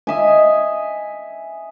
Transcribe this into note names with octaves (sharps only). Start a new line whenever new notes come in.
D#5 E5 G#5